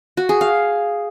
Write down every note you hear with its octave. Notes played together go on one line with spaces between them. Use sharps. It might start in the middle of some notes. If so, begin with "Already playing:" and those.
F#4
G#4
F5